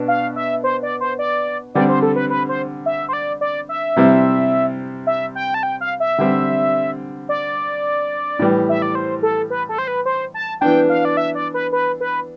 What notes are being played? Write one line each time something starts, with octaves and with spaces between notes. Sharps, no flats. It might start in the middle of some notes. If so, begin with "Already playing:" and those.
Already playing: B2 B3 D4
F5
E5
C5
D5
C5
D5
D3 G3 C4 D5
C5
A4
B4
B4
C5
E5
C5
D5
D5
E5
C3 G3 C4 E4
E5
G5
A5
G5
F5
E5
D3 G3 C4
D5
A2 E3 G3
E5
D5
C5
A4
B4
A4
C5
B4
C5
A5
E3 B3 D4 G5
F5
D5
E5
D5
B4
B4
B4